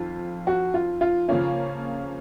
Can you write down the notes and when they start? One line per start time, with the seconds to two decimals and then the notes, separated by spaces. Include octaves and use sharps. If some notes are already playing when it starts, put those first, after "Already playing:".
Already playing: F2 D#3 F4
0.47 F#4
0.74 F4
1.01 F4
1.28 C#3 F3 A#3 C#4 F4